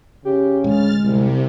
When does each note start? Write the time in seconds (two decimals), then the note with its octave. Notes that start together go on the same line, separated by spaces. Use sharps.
0.25 C#3 G4
0.64 D1 G#3 F6 A6
1.02 C2 C3